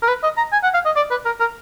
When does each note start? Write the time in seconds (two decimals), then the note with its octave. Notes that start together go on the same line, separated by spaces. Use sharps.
0.03 A#4
0.08 B4
0.23 D#5
0.37 A#5
0.53 G#5
0.63 F#5
0.74 F5
0.85 D#5
0.96 D5
1.11 B4
1.25 A#4
1.40 A#4